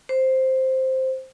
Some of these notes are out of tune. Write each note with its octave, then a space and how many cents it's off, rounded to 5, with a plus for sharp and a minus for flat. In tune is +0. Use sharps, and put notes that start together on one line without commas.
C5 +0